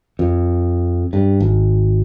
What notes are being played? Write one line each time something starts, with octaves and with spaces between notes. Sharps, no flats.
F2
G2
G#1